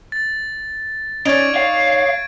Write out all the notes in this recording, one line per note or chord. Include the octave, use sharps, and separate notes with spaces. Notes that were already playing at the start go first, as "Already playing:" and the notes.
A6
C#4 D#4 D5 C#6 G#6 D7
C#5 F5